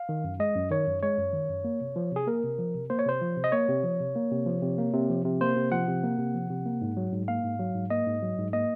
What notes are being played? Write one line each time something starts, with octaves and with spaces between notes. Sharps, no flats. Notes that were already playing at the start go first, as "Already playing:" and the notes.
Already playing: F5
D#3
F#2
G#3 D#5
F#2
D#3 C#5
F#2
G#3 C#5
F#2
D#3
F#2
A#3
C3
F3
C3 G#4
A#3 A#4
C3
F3
C3
A#3 C5
C#5
C3 C5
F3
C3
D#5
A#3 C#5
C3
F3
C3
A#3
C3
F3
C3
A#3
C3
F3
C3
A#3 C5
C3
F3 F#5
C3
A#3
C3
F3
C3
A#3
G#2
F#3
G#2
A#3 F5
G#2
F#3
G#2
A#3 D#5
G#2
F#3
G#2
A#3 D#5